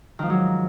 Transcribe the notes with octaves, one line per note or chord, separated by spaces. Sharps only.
G#2 D#3 F3 F#3